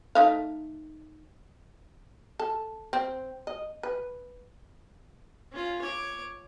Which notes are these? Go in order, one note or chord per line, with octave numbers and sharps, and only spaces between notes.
A3 D#4 F5
A4
C4
D#5
B4
C#4 F4
C#5 D6